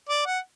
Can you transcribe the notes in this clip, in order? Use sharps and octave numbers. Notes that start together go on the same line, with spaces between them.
D5
F#5